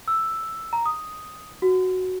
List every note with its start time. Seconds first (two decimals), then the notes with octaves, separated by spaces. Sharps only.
0.08 E6
0.73 A#5
0.86 D#6
1.62 F#4